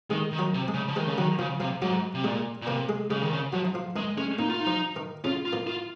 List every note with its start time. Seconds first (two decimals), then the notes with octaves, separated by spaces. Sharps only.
0.10 D#3 G#3 G#4
0.33 D#3
0.39 F#3 F#4
0.54 C3
0.68 G#3 G#4
0.74 C#3
0.88 F3
0.96 D#3 G#3 G#4
1.07 C#3
1.18 D#3 F#3 F#4
1.39 C#3 F3 F4
1.60 C3 F3 F4
1.82 G#2 F#3 F#4
2.15 C3
2.24 A#2 G#3 G#4
2.62 A#2
2.67 C3 A#3 A#4
2.89 G#3 G#4
3.10 C#3 G#3 G#4
3.22 D#3
3.33 C#3
3.53 F3 F#3 F#4
3.65 D#4
3.74 F3 F4
3.96 D#3 G#3 D#4
4.18 G#3 C#4
4.39 A#2 A#3 D#4
4.48 F4
4.60 D#4
4.67 F3 F4
4.96 D#3 D#4
5.24 C#3 C#4 F4
5.46 F4
5.53 A#2 A#3
5.67 F4